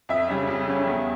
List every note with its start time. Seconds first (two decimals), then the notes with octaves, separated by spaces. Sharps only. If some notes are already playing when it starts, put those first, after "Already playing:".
0.09 F2 E5
0.28 C#3 G3 C#4
0.48 F2
0.68 C#3 G3 C#4
0.87 E2